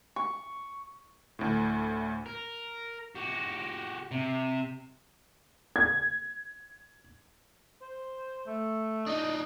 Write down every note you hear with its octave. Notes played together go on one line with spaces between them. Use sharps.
C#6
D2 A2
A#4
F#4 G4
C3
G#6
C5
A3
D4 D#4 D#5